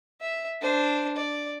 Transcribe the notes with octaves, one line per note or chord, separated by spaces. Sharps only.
E5
D4 C5
D5